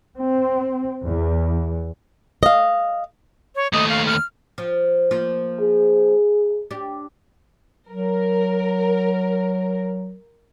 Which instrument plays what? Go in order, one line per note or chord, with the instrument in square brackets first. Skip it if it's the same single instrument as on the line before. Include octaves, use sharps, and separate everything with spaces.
[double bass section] C4
E2
[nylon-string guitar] D#5 F5
[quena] C#5
[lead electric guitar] D#2 A3 [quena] D#5
[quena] F5
F6
[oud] F3
F3 A#3 F4
[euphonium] G#4
[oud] D4 G4
[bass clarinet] F#3 [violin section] A#4